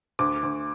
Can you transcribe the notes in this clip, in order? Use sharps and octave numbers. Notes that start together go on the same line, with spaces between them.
D2 D6
D2